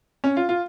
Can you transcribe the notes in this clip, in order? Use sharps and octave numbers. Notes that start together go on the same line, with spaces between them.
C#4
F4
F4